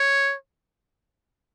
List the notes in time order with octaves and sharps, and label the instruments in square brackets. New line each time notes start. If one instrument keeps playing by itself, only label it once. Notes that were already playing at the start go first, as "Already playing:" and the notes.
Already playing: [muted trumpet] C#5